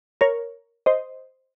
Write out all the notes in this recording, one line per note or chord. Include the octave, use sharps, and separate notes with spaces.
A#4 C#5
C5 D#5